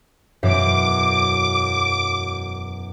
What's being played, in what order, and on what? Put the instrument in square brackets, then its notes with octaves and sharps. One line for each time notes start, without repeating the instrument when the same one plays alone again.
[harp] E1 F#2 E5 [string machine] D6